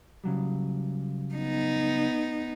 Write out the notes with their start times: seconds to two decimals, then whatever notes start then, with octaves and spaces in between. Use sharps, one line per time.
0.24 C#3 F#3 G3
1.35 B3 D#4